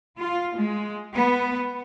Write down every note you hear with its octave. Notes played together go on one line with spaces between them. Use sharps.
F4
G#3
B3